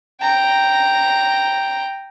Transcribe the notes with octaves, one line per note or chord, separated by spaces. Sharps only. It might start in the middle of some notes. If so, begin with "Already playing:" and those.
G5 A#5